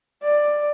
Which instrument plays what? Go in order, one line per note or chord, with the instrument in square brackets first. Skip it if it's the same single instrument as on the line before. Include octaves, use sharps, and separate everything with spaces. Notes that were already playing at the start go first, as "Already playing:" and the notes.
[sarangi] D5